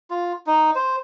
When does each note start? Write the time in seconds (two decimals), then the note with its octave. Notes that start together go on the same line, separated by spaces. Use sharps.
0.10 F4
0.47 D#4
0.75 C5